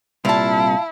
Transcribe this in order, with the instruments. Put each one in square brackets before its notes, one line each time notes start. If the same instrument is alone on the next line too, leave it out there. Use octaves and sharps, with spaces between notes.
[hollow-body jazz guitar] C2 A#2 [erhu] E4 [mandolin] F5 A5